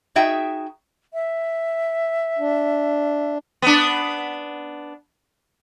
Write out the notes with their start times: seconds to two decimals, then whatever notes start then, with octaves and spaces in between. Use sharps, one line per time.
0.15 D#4 F#4 G#4 E5 G5
1.14 E5
2.39 D4
3.62 B3 D4